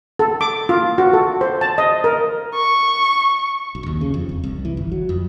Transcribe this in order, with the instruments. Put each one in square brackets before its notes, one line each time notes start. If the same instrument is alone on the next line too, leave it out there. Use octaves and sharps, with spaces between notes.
[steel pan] A4
D6
F4
F#4
A4
C5
A5
D#5
A#4
[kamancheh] C#6
[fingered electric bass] B1
D#2
C#3
F2
E1
C2
E3
G1
F#3
F2